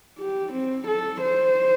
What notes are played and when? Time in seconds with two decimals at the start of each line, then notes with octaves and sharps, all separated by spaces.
0.19 G4
0.53 C4
0.88 A4
1.22 C5